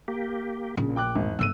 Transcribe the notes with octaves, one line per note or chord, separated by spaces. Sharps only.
A#3 G4
A#1 C#3
G5 D6 F#6
G#1 E2
G1 G#2 D3 A3 E6 D#7